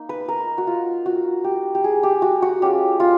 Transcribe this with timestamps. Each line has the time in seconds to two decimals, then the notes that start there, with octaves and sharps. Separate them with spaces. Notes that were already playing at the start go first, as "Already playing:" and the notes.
Already playing: A#3 D#4
0.09 B4
0.29 A#4
0.58 F#4
0.67 F4
1.06 F#4
1.44 G4
1.75 G4
1.84 G#4
2.03 G4
2.22 F#4
2.42 F#4
2.62 G#3 C#4 F4 G4
3.00 F4